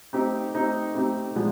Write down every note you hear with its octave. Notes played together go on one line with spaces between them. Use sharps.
A3 C4 D#4 G4
A3 C4 D#4 G4
A3 C4 D#4 G4
A#2 F3 G#3 B3